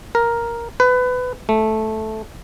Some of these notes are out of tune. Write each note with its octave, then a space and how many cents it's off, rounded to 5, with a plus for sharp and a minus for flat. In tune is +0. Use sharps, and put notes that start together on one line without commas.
A#4 +5
B4 +25
A3 -10